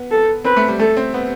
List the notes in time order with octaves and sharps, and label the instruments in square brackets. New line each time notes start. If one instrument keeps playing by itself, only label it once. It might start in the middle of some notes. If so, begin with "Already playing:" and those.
Already playing: [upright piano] B3
[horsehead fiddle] A4
[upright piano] C4 [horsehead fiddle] B4
[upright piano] A3
G3
[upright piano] A3 [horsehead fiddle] A4
[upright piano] C4
B3